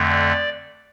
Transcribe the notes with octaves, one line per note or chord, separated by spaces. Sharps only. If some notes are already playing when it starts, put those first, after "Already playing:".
Already playing: F2 D3 A3
D5